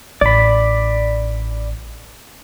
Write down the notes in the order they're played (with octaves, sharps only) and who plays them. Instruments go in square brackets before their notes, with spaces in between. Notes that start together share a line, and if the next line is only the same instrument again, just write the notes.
[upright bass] A1 [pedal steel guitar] D5 B5